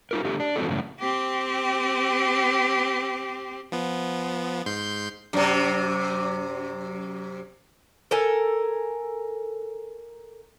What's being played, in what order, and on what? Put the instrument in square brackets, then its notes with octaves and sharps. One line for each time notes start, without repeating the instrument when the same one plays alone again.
[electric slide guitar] D#4 F4 A#4
D3 A3 G4
D4
G2 E3 C4 F4 F#4 A4
F#2 A2 C#3
[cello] C4 G4
[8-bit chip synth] F3 B3
G#2 C6 G6
[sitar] F#2 C3
[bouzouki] A4 A#4 G#5